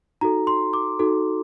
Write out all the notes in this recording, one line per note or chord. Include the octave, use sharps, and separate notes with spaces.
D#4 F#4 A4 A#5
C6
D6
D#4 F#4 A4